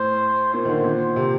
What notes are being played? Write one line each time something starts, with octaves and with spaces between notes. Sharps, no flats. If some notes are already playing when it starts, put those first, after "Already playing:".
Already playing: A2 C5
A#2 C5
D#3
D3
A#2
C3